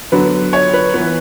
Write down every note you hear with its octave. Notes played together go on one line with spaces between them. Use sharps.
D3 F#3 B3 B4
C#5
B4
E3 B3